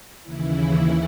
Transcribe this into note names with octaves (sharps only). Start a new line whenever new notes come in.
D#2 C#3 E3 E4